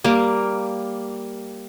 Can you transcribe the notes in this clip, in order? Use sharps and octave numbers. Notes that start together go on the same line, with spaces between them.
G3 A#3